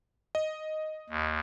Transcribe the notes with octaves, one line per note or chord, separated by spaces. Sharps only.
D#5
D#2